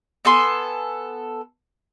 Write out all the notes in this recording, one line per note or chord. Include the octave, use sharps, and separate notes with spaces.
B3 A4 G#5 C6